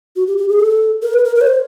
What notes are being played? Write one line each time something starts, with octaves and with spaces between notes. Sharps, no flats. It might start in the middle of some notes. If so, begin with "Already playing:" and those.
F#4
G4
G4
G#4
A4
A#4
B4
A#4
A#4
C#5
C5